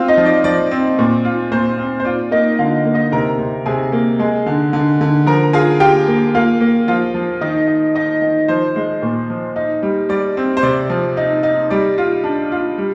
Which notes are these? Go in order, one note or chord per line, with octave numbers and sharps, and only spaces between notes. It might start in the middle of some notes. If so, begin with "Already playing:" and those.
Already playing: C4 F4 F5
D#4 D#5
F3
D5
F3 D5
C4
A#2
F4
A#2 C5
C4
C5
F4 D5
A#3 D#4 D#5
D3 F4 F5
A#3
D#4 D#5
C3 A#4 A#5
C3
C3 G#4 G#5
A#3
G#3 G#4 G#5
D3
D3
D3
F3 A#4 A#5
F4 G#4 G#5
F4 G4 G5
A#3
A#3 F4 F5
A#3
F3 F4 F5
F3
D#3 D#4 D#5
D#4
D#4 D#5
D#3
F3 C5
G#3
A#2
F3
D#4
G3
G3 D5
C4
C5
C3 D5
F3
D#4
D#4
G3 D5
F4
D4
F4
G3